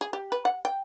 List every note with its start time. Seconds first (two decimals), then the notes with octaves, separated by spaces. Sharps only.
0.01 G#4
0.13 G4
0.32 B4
0.45 F#5
0.65 G5